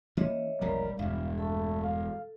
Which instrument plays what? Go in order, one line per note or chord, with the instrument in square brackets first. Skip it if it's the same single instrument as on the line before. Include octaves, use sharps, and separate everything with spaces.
[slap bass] E3 A#3 C#4 [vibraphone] C#5 D#5 E5
[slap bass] E1 A#1 A#2 [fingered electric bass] G3 [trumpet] A#4
[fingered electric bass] E1 [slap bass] G2 G3 [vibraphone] E5 [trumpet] F5
[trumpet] A3 [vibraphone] A4
[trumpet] F5